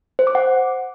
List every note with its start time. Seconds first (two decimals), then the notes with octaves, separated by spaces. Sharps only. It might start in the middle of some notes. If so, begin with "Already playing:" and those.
0.19 C5
0.27 D6
0.35 F#5